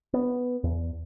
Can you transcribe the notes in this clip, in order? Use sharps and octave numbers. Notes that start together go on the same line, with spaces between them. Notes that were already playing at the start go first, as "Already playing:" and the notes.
B3
E2